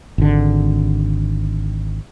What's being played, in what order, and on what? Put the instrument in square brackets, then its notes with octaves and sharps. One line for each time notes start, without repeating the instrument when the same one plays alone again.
[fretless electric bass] G#1 D3